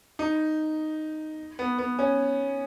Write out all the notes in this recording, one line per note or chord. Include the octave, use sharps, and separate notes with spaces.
D#4
B3
B3
C#4